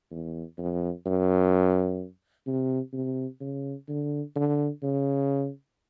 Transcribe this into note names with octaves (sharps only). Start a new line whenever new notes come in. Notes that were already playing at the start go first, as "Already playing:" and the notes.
E2
F2
F#2
C3
C3
C#3
D3
D3
C#3